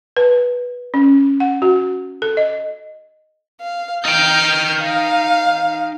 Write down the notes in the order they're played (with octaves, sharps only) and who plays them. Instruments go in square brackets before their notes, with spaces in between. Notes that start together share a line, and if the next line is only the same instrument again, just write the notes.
[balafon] B4
C#4
F#5
F#4
A4
D#5
[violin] F5
[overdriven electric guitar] D#4 G5 [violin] F6 G6
[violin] F5